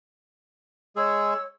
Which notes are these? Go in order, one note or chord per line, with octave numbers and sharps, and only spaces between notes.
G#3 G#4 C#5 E6